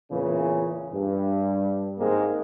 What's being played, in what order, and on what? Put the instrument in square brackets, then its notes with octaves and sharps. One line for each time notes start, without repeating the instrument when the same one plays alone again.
[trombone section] E2 A#2 C#3 E3
G2
G#1 G#2 G#3 A#3 C4